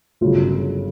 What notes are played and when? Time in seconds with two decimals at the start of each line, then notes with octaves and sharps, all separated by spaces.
0.21 G1 F#2 C#3 F4